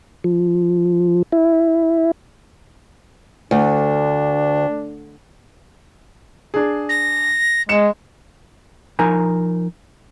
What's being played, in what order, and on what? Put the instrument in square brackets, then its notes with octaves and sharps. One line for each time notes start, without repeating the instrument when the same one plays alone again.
[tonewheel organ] F3
E4
[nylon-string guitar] D2 [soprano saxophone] D4
[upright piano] D4 G#4
[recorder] A#6
[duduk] G#3 [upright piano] C#7 E7
[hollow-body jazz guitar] F3 D#4 A#4 G#5